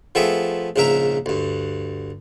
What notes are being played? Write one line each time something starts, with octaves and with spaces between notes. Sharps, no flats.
F3 A3 B3 C4 G#4 E5
A#1 G#2 C#3 A#4 E5 A#5
D2 G2